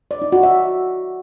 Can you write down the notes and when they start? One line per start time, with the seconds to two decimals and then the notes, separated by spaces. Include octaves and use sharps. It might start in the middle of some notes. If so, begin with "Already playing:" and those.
0.11 D5
0.22 D#4
0.32 F#4
0.43 E5